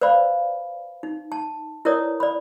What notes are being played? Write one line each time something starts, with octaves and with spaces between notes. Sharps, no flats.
B4 C5 D5 F5 B5
D#4
A5
E4 A#4 B4 C#5 D5 D#6
D5 B5